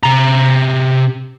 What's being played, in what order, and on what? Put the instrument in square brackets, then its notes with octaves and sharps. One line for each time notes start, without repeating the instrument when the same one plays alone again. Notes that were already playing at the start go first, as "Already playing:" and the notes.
[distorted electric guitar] C3 A#5